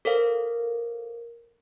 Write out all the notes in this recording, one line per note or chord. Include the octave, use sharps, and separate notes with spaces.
A4 A#4 C5 F5